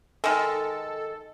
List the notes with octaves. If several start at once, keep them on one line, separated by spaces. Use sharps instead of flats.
D#3 G#3 A4